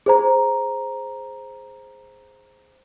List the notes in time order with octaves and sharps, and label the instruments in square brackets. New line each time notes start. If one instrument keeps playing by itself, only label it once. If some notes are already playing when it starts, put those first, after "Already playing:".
[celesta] G#4 C5 A#5